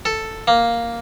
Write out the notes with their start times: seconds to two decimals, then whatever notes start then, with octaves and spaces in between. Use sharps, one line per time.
0.05 A4
0.48 A#3